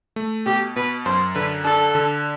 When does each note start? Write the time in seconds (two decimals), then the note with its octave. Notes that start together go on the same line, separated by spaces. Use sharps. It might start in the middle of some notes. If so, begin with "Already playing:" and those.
0.16 A3
0.46 B2 G4
0.76 B2 B4
1.05 F#2 C5
1.35 D3 B4
1.64 D4 A4
1.95 D3